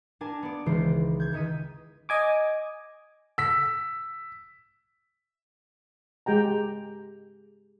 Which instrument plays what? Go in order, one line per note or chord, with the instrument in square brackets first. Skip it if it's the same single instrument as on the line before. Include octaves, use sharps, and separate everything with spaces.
[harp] D4 A#4 G#5 A5
B3 D5
C#2 D#3 E3 G#3 C5 C6
G6 G#6
C#2 D#3 D#5 B6 D#7
[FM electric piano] D#5 G#5 D6
[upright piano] E6 B6
[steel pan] G#3 G4 G5 A#5